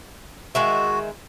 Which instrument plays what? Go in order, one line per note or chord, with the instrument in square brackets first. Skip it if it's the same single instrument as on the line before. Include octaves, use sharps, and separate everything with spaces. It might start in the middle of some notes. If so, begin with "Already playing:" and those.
[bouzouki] D#3 G#3 E5 [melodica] F#4